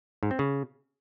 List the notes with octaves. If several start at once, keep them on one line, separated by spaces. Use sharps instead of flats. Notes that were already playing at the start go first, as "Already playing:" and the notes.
G#2
C4
C#3